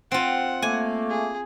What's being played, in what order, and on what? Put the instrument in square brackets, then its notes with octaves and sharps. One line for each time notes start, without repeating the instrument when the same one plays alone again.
[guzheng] C4 F4 [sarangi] F#5
[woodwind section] A3 A#3 [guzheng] G#5
[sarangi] G#4